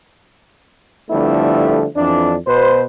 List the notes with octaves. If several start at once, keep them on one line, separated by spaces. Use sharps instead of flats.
D3 F3 G3 A3 B3 E4
F2 E3 D4
B2 B4 C5